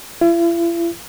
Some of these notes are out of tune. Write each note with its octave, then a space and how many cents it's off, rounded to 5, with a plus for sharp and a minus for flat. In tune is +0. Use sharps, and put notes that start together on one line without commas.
E4 +45